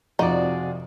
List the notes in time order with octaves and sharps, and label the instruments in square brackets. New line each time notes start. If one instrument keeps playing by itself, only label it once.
[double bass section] F2 C3 [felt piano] F3 [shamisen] D#4 [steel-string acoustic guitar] F#4 G#4 D5